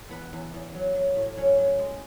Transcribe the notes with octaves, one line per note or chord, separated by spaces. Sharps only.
E2 B3 B4
E2
E2
F#3
F#3
A2
F#3 C#4 C#5
F#3
G#3